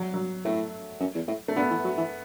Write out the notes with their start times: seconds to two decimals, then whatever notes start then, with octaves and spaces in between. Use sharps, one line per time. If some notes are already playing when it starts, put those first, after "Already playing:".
Already playing: F#3
0.14 F#3
0.44 A2 A3
1.00 F#2
1.14 E2
1.28 A2
1.48 A3
1.56 D3 B3
1.70 E3
1.84 F#3
1.97 E3